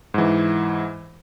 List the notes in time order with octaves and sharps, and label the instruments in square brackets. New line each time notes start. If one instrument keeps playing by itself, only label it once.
[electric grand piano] G#2 E3